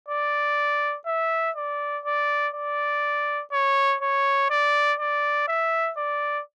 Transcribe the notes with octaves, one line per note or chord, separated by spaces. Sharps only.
D5
E5
D5
D5
D5
C#5
C#5
D5
D5
E5
D5